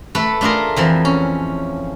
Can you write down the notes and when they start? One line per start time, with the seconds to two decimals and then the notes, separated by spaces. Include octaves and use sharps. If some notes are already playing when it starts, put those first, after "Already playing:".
0.15 A3 A4 B4
0.41 A3 D4 F4 G#4 A#4
0.76 F2 E3 F3
1.05 C#4